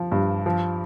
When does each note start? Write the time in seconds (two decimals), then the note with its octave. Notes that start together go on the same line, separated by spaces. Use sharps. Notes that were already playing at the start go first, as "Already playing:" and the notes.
Already playing: F3
0.12 G2
0.46 F3